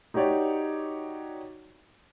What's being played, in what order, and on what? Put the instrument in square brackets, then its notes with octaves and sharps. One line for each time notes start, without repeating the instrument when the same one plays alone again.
[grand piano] D#4 F#4 G4 C#5 D5